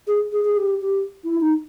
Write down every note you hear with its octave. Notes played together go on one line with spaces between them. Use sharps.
G#4
G#4
G#4
G4
G4
E4
D#4